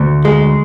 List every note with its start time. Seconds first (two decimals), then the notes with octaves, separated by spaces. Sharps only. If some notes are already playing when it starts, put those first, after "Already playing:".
Already playing: D2
0.25 G#3